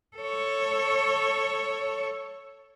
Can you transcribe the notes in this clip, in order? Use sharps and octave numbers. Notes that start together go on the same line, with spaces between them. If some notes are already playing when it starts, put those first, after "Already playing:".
A4 C#5